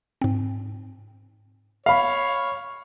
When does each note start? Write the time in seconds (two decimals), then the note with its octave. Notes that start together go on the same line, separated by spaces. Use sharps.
0.22 G#2 C4
1.86 C#5 F5 B5